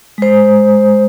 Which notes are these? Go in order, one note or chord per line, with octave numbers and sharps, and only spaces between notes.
G#3 C5